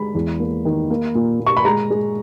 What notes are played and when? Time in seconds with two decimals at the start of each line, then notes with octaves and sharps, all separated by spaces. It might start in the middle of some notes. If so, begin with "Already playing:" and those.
Already playing: G#3 B5
0.15 E2
0.40 A#3
0.65 D#3
0.90 A#3
1.15 A#2
1.40 A#2
1.46 C#6
1.57 B5
1.65 G#3 A#5
1.90 G#3